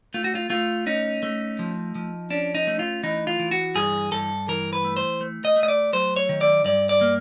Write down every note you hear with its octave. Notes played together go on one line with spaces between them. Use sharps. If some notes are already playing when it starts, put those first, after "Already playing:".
A3 F4
F#4
F4
A3 F4
C#4 D#4
A3
F3
F3
C#4 D4
D#4
A3
F4
E3 D#4
F4
E3
F#4
G2 G#4
G2 A4
E3 A#4
B4
A3
C5
A3
D#5
A3
D#5
D5
F#3 C5
C#5
D#3
D5
G2 D5
D5
A#3